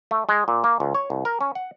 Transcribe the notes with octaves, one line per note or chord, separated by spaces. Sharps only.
A3
G#3
A#2
A#3
C#2
C#5
C2
A#4
C#4
F#5